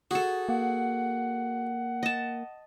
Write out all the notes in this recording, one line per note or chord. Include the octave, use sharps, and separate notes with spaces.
F#4 G#4 A4
A#3 F#5
D#5 A5